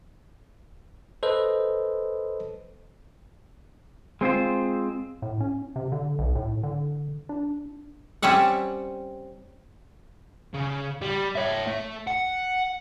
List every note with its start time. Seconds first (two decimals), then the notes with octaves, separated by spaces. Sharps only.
1.23 A4 B4 C5 D#5
4.21 G#3 C4 F4 C5
5.22 A2
5.40 C#4
5.76 C3
5.92 D3
6.19 B1
6.35 A2
6.63 D3
7.29 D4
8.22 G3 C4 C#4 E5 F#5
10.54 C#3
11.01 G3
11.35 C#5 E5
11.67 A3
12.07 F#5